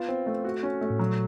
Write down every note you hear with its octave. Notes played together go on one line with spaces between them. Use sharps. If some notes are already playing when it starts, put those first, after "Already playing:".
Already playing: B3 F4
C4
A3
F#4
C#4
A3
A2
A#2 F#3